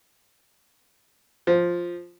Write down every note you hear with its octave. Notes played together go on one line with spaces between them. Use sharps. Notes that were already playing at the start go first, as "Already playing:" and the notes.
F3